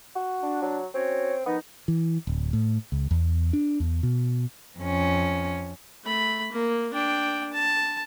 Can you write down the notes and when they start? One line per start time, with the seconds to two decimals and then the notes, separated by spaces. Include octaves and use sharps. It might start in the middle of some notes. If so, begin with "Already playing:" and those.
0.15 F#4
0.42 D4
0.62 F#3
0.94 C4 C#4 F#4 C#5
1.46 D#3 F3 B3 D#4
1.88 E3
2.27 D1
2.53 A2
2.92 C#2
3.11 E2
3.53 D4
3.80 E2
4.03 B2
4.79 F2 C#4
6.04 A3 B5
6.52 A#3
6.94 D4 G5
7.53 A5